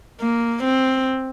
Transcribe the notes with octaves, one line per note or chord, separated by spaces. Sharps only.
A#3
C4